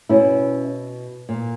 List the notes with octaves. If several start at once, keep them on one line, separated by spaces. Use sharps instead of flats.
B2 C#4 E4
A#2